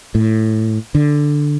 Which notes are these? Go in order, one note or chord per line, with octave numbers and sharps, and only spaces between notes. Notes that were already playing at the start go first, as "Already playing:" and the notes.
A2
D3